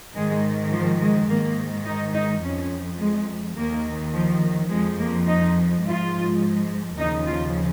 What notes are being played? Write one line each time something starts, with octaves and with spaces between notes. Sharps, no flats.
G#2 D#3 G#3
F3
G#3
G#2 D#3 A#3
D#4
D#4
F2 F3 C#4
G#3
D#2 D#3 A#3
F3
F2 F3 G#3
A#3
D#4
G#2 F3 F4
D#2 C#3 F3 D#4
F4